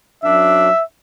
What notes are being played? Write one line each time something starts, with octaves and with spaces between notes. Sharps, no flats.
F#2 F#3 D4 E5